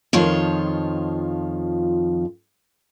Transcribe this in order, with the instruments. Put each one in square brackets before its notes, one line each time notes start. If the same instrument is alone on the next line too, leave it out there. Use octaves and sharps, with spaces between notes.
[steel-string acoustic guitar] F2 D#3 F3 F4 C#5